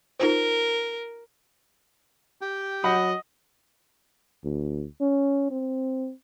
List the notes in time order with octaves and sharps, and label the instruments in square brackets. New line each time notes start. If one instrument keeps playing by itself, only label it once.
[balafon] D#4 F4 C5 [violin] A#4
[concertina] G4 G5
[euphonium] F#3 [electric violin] D#5 [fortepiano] F#5 B5
[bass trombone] D2
C#4
C4